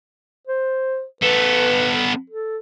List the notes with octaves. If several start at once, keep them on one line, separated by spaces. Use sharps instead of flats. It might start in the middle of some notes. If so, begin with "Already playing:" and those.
C5
B3 A4 B4
A4